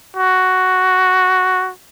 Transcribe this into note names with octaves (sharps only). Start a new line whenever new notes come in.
F#4